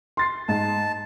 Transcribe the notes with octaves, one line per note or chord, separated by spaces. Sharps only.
C6 A6 C7
G#2 A5